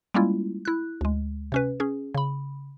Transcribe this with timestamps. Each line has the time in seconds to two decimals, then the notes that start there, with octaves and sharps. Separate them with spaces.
0.14 G3 G#3 A#3 C#4 E4 F4
0.65 E4 F#6
1.01 D2 G#3
1.52 C3 C#4 B4
1.80 C#4 G#4
2.15 C#3 B5